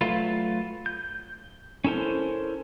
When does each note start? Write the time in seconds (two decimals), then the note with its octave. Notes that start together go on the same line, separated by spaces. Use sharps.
0.01 F#3 A3 F4 B4
0.86 G6
1.84 C#4 E4 A4 A#4 C5